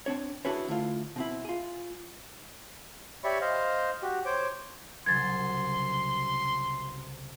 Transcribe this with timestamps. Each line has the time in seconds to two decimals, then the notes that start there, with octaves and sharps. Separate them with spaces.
0.06 C4 D4 C#5
0.45 D4 E4 F#4 G#4 B4 C#5
0.68 D3 A3 E4 F4
1.16 B2 C4 E4
1.45 F4 G#4
3.24 G4 C#5 D5 E5 B5 C#6
3.41 C5 D#5 F5
4.02 F#4 G4
4.25 C5 C#5 D6
5.06 C2 C#3 F#3 C6 G#6 A6